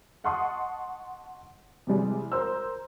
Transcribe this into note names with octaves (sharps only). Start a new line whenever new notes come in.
D#5 F#5 A5 C6 C#6 D#6
C3 E3 G3 G#3
A#4 C5 A#5 E6